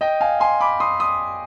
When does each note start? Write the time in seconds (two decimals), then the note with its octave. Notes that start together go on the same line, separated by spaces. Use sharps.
0.01 D#5 G5
0.21 F5 G#5
0.40 G#5 C6
0.61 B5 D6
0.80 C6 D#6
1.00 C6 D#6